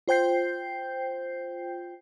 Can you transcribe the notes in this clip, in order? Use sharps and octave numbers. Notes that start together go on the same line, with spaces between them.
F4 C5 G5 G6 C7